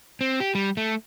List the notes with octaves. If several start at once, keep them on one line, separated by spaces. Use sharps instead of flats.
C4
G4
G3
A3